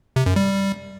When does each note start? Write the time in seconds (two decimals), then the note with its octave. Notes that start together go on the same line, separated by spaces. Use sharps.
0.16 C3
0.26 F#2
0.36 G3